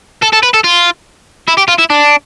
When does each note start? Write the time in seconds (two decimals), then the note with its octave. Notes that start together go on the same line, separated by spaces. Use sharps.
0.22 A4
0.33 A4
0.43 B4
0.54 A4
0.64 F4
1.48 E4
1.58 G4
1.69 F4
1.79 E4
1.90 D4